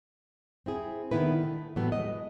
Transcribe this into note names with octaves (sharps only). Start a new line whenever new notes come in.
C4 E4 G#4
D3 D#3 B3 E4 B4
A3
A2 E3 F#3 G3 A3 B3
G#3 D#5